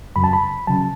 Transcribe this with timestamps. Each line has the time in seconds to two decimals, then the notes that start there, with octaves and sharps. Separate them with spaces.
0.16 F#2 C#3 F#3 B5
0.24 A5
0.33 B5
0.67 C#3 F#3 A5